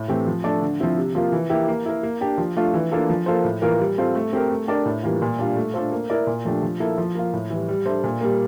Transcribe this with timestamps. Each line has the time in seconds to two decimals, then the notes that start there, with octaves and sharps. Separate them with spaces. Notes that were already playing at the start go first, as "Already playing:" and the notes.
Already playing: A2
0.08 E3 A3 C4 G4
0.27 F3
0.44 A3 D4 A4 D5
0.61 D3
0.80 F3 C4 E4
0.97 C3
1.15 F3 A#3 F4
1.32 E3
1.50 A#3 E4 G4
1.68 A#3
1.86 E4 A#4
2.03 A#3
2.21 D4 G4
2.38 F3
2.57 A3 D4 F4
2.74 E3
2.92 A#3 D4 F4 A4
3.10 F3
3.26 A#3 F4 A4 C5
3.44 A2
3.62 E3 A#3 F4 A#4
3.79 G3
3.98 C4 F4 A4 C5
4.15 A3
4.33 C4 G4 A#4
4.50 A3
4.68 D4 G4 A#4 D5
4.86 A2
5.03 E3 G3 A#3 F4
5.22 A#2
5.39 G3 D4 F4
5.56 A3
5.74 D4 F4 A4 C5
5.92 A#3
6.10 E4 A#4 D5
6.27 A#2
6.45 F3 A3 D4 G4
6.62 F3
6.80 A#3 E4 A4
6.98 F3
7.15 A#3 F4
7.34 A2
7.50 E3 G3
7.68 G3
7.86 D4 A4 C5 E5
8.04 A#2
8.21 G3 A#3